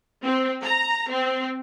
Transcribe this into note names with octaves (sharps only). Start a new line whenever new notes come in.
C4
A#5
C4